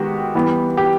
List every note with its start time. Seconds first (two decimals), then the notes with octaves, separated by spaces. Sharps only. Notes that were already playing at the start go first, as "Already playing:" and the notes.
Already playing: D#3 G#3 B3 F#4 G4
0.35 E3 G3 B3
0.77 G4